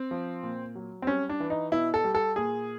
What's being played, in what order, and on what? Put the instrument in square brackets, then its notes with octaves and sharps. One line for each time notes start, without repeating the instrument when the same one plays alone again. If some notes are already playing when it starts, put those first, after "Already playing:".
Already playing: [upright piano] C4
F3
A#2
F#3
C4
G3 C#4
D4
E3
D#4
B2 E4
A4
G3
A4
A#2 G#4